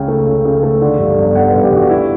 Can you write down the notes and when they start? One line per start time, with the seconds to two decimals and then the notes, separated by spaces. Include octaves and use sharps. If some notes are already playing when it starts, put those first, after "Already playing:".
Already playing: C#2 C#3 G5
0.08 A3
0.26 C#3
0.45 C#3
0.63 A3
0.81 D3
0.99 G2
1.18 G1
1.35 G1 F#5
1.50 G2 B4
1.63 G4
1.72 G2 F#4
1.90 G3 E4